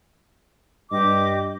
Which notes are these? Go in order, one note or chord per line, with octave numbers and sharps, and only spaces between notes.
G2 G4 D#5 D6